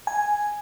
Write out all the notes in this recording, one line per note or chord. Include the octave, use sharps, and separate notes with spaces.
G#5